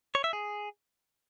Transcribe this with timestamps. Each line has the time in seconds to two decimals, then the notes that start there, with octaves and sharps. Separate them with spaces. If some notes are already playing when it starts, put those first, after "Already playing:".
0.15 C#5
0.24 E5
0.33 G#4